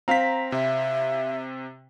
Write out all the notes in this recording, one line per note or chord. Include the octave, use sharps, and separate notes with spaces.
C4 F5 A#5 B6
C3 E5